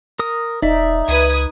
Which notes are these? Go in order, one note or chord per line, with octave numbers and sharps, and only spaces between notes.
A#4 D#6
E1 D#4 D5 E5
C#2 B4 D#6 G#6